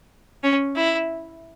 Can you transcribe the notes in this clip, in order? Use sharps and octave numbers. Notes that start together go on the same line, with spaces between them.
C#4
E4